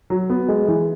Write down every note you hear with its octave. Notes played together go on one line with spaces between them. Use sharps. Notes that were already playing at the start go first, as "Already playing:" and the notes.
F#3
B3
G#3
E3